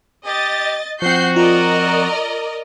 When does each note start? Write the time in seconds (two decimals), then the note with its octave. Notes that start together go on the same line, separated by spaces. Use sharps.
0.26 G4 D#5 A6
1.02 F3 C4 F#4 F#5 G6 C7
1.36 F4 A#4 D5 D#5